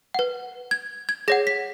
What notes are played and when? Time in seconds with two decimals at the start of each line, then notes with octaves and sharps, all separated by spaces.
0.14 B4 F#5
0.71 G#6
1.09 G#6
1.28 G#4 C#5 F#5 A#6
1.47 B6